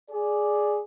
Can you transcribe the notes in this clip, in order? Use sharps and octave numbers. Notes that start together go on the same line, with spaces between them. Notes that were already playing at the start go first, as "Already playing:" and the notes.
G#4 D5